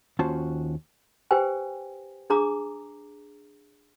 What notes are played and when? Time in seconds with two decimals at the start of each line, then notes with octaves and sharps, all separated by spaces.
0.19 D#2 C#4 F4 F#4 C5 A5
1.31 G4 B4 C5 G5 G#5
2.30 D4 G#4 A#5 D6 D#6